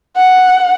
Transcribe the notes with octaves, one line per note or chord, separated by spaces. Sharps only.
F#5